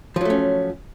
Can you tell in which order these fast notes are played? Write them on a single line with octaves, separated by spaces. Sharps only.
F3 F#3 A3 C#4